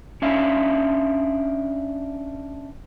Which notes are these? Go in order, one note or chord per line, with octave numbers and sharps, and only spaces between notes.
C#4 D4 E5 F5